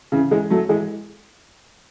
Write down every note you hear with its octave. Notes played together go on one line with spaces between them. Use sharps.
C#3 E3
E3 G#3
F#3 A3
E3 G#3